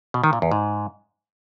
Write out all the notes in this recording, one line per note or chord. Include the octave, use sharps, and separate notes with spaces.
B2
D#3
A#2
E2
G#2